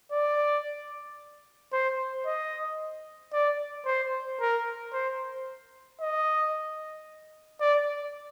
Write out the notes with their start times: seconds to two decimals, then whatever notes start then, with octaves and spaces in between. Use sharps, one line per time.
0.12 D5
1.72 C5
2.26 D#5
3.33 D5
3.86 C5
4.40 A#4
4.93 C5
6.00 D#5
7.61 D5